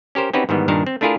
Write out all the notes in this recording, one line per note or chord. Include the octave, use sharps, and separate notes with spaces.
C#4 G4 A#4 C5
C4 C#4 D#4 F#4 G4 B4
G#2 D#3 E3 G3 B3
G2 A#2 D#3 D4 A#4 A5
C4
A3 D4 E4 F4 G#4 A#4